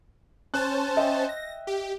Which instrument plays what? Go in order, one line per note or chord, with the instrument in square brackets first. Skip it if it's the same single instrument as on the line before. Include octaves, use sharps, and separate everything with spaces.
[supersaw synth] C#4 C5 A5 [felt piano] F#6
[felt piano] D#5 E5 G5
[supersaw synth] A#6
G4